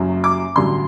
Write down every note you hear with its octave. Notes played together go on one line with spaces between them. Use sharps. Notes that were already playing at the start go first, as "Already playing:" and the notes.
Already playing: F#1 F#2 F#3
D6
A1 G2 D3 F#3 C6